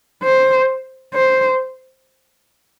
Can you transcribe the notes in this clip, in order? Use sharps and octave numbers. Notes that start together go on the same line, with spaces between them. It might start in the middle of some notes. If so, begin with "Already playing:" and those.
C5
C5